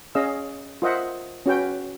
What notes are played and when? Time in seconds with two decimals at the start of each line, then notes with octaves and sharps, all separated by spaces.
0.15 C#4 G#4 D#5 F5 E6
0.82 F4 A#4 C5 D#5 E5 F#5
1.46 C#4 F#4 B4 G5